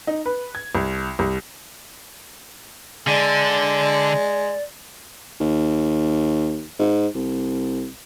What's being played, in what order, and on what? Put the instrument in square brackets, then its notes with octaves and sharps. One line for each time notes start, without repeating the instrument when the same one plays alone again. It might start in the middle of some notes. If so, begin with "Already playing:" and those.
[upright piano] D#4
B4
G#6
C2
C2
[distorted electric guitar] D3 [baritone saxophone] G#3 [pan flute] D5
[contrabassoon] D#2
G#2
C2